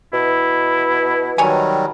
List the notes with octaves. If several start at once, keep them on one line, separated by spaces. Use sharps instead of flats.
B2 E4
D#3 F#3 G3 C#5 G#5